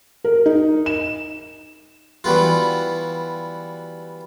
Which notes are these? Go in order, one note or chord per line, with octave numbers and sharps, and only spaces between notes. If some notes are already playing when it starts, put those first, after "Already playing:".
A#4
D#4
E7
E3 F#3 G3 B3 F4